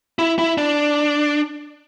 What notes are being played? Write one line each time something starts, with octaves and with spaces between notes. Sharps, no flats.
E4
E4
D4